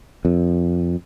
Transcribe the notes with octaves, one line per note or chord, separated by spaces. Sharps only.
F2